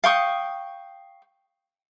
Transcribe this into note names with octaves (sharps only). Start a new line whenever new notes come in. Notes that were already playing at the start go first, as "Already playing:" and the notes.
F5 G5 C#6 D#6